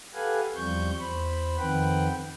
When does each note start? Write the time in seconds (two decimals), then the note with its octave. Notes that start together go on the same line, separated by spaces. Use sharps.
0.14 G4 A4 B4 F5 F#5 G#5
0.55 E2 F3 G3 C4 C#6 G6
0.99 E2 C5 B5
1.58 F2 D#3 C4 B4 F#5 G5